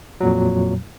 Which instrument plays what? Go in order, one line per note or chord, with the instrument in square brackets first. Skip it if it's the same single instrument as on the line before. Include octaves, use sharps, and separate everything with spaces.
[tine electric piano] F2 A#2 F#3